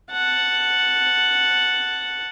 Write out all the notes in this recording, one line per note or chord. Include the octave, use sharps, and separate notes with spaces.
F#5 A5